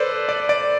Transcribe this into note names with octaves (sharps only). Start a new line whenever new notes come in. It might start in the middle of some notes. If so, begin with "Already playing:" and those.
Already playing: A4 B4 C5 D5
D5
D5